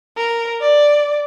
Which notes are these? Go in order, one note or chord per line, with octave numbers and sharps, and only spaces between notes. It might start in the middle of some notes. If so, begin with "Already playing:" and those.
A#4
D5